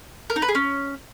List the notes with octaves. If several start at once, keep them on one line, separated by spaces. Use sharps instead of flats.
A#4
D#4
B4
G#4
C#4